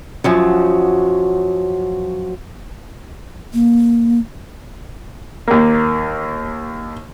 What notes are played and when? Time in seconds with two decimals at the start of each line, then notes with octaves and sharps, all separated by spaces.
0.24 F#2 F3 F#3
3.54 A#3
5.48 D#2 A#3